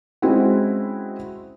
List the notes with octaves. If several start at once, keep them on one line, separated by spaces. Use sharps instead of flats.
G#3 C4 C#4 E4 F#4